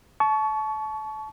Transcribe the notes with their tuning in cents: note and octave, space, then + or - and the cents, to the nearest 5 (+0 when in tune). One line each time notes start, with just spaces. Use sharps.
A5 -30 C#6 +20